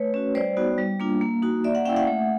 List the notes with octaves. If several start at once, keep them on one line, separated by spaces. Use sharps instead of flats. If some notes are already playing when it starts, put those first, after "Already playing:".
Already playing: A3 B4 C#5
C#4 F#4
G3 C5 D5
B3 D#4 F#4
G3
A#3 D4 F4
A#3
D#4 F#4
A#3 D5 E5
E5 F#5
C#4 E4 F5 G5
E5 F#5
A3